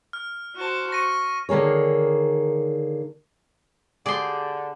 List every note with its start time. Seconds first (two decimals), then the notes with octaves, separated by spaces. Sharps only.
0.13 F6
0.57 F#4 C5 A5
0.92 C#6 A#6 D#7
1.49 D3 D#3 A#3 G#4 C#5
4.06 D3 G4 G#4 D5 C6